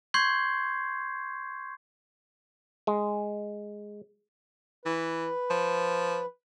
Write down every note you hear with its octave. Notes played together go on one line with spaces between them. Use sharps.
C6 C#6 G6 G#6 C7
G#3
E3 B4
F3